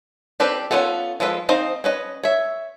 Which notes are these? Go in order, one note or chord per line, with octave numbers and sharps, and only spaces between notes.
C4 D4 G4 A4 B4
B3 C#4 F4 F#4 A4
F3 G#3 A4 B4
C4 D#4 C5 D#5 F5
C#4 B4 D#5
C#5 E5